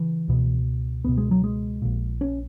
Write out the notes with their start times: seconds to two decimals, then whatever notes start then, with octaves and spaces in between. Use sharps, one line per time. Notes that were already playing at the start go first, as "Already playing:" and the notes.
Already playing: C#3 E3
0.28 C#2 B2
1.04 C#2 B2 B3
1.18 G#3
1.31 F#3
1.44 G#3
1.82 A#1 A#2
2.21 C#4